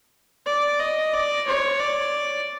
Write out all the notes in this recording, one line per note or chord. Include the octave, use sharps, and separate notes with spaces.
D5
D#5
D5
C#5
D5